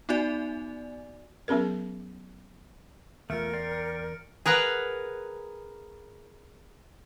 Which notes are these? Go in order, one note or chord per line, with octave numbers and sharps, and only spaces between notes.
B3 D#4 F#4 D5 G#5
F#3 B3 C#4 G#4 A#4
E2 A3 F4 A#4 F6 C#7 D7
D5 G5 C6
G#4 A#4 B4 F#5